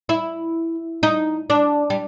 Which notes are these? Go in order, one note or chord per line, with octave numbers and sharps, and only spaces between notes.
E4
D#4
D4
G3